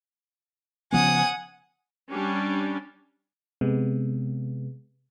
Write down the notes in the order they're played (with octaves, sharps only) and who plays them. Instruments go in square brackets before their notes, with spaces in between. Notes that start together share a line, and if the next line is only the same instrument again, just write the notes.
[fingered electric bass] C#3 F3 B3 [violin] F#5 D#6 [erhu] G#5
[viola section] G3 C#4 D4
[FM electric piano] C3 G#3 B3